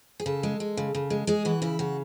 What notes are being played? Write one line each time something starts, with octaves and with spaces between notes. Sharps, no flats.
G#4
C#3 A4
G#3
G#3
C#3
C#3
G#3
G#3 G#4
E3 F#4
C#3 E4
C#3 F#4